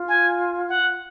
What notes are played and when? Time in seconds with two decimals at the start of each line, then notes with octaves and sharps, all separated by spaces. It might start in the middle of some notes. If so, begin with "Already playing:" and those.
Already playing: F4
0.08 G#5
0.69 F#5